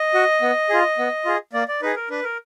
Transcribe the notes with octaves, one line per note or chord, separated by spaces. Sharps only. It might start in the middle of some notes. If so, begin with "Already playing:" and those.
Already playing: D#5
F#4
B3
F4 G#4
B3
F4 G#4
A#3 D5
D5
D#4 G#4 B4
A#4
D4 B4
A#4